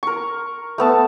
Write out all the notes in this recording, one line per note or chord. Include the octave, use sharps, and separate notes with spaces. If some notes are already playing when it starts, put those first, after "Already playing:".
A#4 C#6
A3 B3 A5